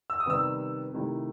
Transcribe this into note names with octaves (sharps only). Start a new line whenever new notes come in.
E6
D#6
C3 D#3 G3 B3 E6
C3 D#3 A3 E4